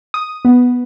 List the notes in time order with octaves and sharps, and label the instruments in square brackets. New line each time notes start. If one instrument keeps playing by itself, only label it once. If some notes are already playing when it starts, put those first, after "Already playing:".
[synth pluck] D#6
B3